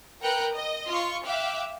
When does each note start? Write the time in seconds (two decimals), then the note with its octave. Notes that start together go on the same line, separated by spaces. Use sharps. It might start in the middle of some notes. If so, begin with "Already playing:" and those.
0.22 A#4 B4 G5 F#6 C#7
0.54 D#5
0.88 F4 C6 C#6
1.26 E5 F5 G5 D6 F#6